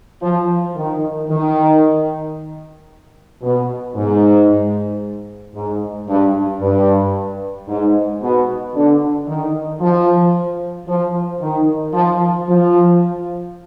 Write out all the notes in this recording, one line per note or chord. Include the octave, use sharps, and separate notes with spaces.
F3
D#3
D#3
B2
G#2
G#2
G2
G2
G#2
B2
D3
D#3
F3
F3
D#3
F3
F3